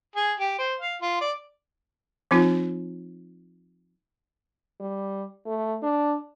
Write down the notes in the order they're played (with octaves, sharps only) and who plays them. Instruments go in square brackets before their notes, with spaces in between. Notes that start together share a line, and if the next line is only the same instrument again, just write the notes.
[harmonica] G#4
G4
C5
F5
F4
D5
[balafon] F3 C4 D#4 F4
[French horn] G3
A3
D4